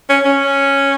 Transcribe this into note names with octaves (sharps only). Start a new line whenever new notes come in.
C#4
C#4